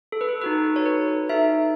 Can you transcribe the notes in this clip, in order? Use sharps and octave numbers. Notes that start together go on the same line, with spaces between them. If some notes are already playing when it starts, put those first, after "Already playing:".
A4
B4
A4
D#4 F#4 A4 B4
C#5
B4
D#4 A4 E5